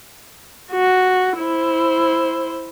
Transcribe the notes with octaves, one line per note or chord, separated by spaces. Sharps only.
F#4
E4 C5